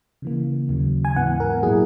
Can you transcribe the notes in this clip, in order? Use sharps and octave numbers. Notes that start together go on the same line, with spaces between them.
C#3 E3 A#3
D#2 C#3 F#3
G#5
G#2 E3 B3 F#5
A#4
A#2 F#3 A#3 E4 G#4